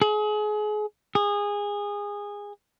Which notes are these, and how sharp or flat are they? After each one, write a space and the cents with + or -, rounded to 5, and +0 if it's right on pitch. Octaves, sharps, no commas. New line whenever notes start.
G#4 +30
G#4 -20